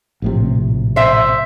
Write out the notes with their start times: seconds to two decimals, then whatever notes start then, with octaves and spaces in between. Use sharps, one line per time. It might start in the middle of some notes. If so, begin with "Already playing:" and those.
0.22 A#1 A2 C3
0.96 C5 E5